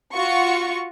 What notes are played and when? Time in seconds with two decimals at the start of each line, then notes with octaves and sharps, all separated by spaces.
0.13 F4 F#4 C#6